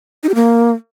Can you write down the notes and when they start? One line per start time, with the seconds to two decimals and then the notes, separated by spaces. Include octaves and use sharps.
0.23 D#4
0.29 G4
0.35 A#3